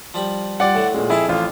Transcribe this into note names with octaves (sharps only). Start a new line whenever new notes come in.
F3 G3 B5
G3 F4 D5 F#5
A2 D3
A#2 G#3
F2 E4 G#4 F5 A5
A1 F4